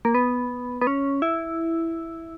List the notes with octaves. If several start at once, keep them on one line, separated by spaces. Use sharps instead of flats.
A#3
B3
B3
C#4
E4